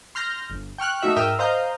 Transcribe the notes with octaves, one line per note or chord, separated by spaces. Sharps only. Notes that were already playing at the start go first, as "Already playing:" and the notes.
C6 F6 G6 A#6
G1
G5 C#6 F6 F#6
A3 D#4 F#4 E5
G#2 A#4 E5 G5 D#6 F6
C5 D#5 F5 A#5 F6 G6